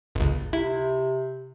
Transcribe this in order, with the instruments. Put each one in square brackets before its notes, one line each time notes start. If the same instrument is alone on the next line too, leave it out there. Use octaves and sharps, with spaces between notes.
[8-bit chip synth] G1 C#2
[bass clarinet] C3 [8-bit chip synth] E4